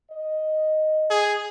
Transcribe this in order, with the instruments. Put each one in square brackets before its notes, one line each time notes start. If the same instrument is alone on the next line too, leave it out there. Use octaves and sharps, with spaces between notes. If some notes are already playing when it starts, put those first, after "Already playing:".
[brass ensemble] D#5
[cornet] G#4